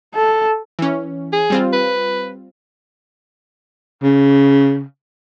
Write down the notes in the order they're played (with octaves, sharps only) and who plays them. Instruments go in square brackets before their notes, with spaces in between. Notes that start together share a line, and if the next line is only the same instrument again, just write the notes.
[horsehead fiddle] A4
[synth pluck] E3 C#4
[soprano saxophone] G#4
[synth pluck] G3 C4 F4
[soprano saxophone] B4
[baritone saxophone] C#3